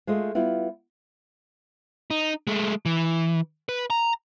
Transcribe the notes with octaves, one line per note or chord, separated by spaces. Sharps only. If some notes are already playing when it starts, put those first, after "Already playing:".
G#3 A3 F4 D#5
G3 B3 E4 F4
D#4
G#3 A3
E3
B4
A#5